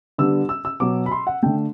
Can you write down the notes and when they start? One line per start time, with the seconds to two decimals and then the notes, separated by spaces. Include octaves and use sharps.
0.18 D3 G3 B3 E6
0.49 E6
0.65 E6
0.80 B2 F#3 B3 D6
1.06 B5
1.11 C6
1.27 F#5
1.43 D3 A3 G5